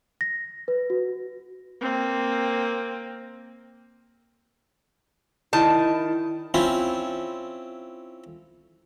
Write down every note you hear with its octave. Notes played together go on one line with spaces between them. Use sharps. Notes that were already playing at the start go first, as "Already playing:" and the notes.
A#6
B4
F#4
A#3 C4
D#3 E4 A5
C4 C#4 E4 F4